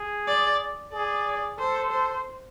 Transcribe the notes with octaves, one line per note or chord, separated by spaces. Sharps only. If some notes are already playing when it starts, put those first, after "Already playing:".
Already playing: G#4
D5
G#4 D5
A4 C5
C5